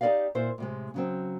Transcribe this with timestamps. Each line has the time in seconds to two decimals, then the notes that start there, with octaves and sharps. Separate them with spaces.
0.01 D#4 G4 A4 D5 D#5 F5
0.35 A#2 E4 C5
0.58 A2 C3 G#3
0.94 C#3 F#3 C4